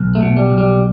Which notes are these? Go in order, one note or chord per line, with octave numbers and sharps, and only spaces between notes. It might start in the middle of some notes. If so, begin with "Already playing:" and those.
Already playing: B1
A3
B2
G3
B1
G3